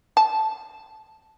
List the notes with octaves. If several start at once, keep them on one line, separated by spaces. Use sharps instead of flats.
A5